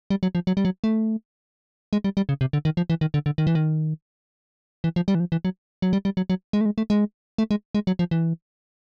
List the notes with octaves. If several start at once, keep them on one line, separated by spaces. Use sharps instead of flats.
G3
F#3
F3
F#3
G3
F#3
A3
G#3
G3
G3
C#3
C3
D3
D#3
F3
E3
D#3
D3
D3
D#3
E3
D#3
E3
F3
G3
E3
F3
E3
F#3
F#3
G3
G3
F#3
F#3
G#3
A3
G#3
A3
G#3
A3
G#3
G#3
F#3
F3
E3